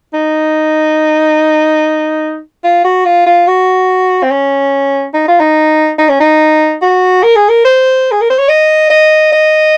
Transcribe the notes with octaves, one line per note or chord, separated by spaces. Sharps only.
D#4
F4
F#4
F4
F4
F#4
C4
C#4
D#4
F4
D#4
D#4
C#4
D#4
F#4
A#4
G#4
A#4
C5
G#4
A#4
C5
C#5
D#5
D#5
D#5